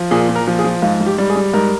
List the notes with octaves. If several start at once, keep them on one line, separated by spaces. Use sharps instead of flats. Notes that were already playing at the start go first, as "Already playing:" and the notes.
Already playing: F3
A#2 G#4
A#2
A#4
F3
G#4
F3
G#2 F4
G#2
G4
G3
G#4
G3
G#2 A#4